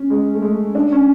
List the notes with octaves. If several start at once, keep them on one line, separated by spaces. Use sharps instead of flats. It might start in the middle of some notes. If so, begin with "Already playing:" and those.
Already playing: C#4
G#3
A3
G#3
D4
C#4